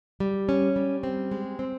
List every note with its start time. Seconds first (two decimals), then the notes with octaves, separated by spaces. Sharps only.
0.20 G3
0.49 C#4
0.76 G3
1.03 C4
1.31 G#3
1.59 C4